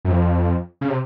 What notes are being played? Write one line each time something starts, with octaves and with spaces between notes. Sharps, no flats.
F#2
F2
C#3
C3